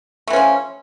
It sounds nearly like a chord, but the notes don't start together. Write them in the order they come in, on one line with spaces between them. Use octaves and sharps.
A3 E3 C#4 F3